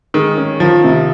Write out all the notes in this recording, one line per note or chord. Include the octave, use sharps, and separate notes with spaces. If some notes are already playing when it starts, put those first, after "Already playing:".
D#3 G#3
C#4
D#3 F3
C3